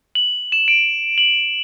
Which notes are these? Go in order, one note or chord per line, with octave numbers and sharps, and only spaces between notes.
F#7
E7
D7
F#7